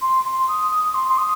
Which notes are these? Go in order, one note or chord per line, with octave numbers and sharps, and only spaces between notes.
C6
C6
D#6
D#6
C6
C6
D#6